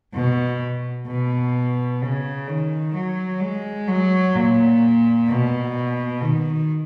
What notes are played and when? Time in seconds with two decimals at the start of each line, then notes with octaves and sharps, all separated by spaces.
0.14 B2
1.07 B2
2.02 C#3
2.47 D#3
2.94 F#3
3.41 G#3
3.88 F#3
4.35 A#2
5.27 B2
6.21 D#3